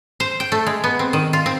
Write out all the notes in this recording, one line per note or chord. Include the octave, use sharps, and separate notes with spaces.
C5
G5
A3
G#3
B3
C4
D#3
F4
C4